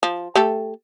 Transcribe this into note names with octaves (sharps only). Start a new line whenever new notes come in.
F3
A3 G4 A4